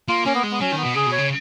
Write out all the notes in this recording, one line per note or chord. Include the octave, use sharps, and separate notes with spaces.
A#3 F4
A#3 C#4
B3
G#3
B3
F#3 C#4
D#3
B3
B2
C#3 G#4
B2
C#5
C#3